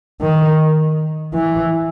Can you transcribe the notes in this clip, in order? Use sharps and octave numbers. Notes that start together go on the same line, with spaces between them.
D#3
E3